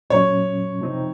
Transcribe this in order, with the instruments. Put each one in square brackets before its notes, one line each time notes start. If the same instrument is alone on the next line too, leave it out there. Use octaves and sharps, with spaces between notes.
[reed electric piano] A#2 F#3 C#4 [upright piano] C#5
[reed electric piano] C3 F3 C4 D#4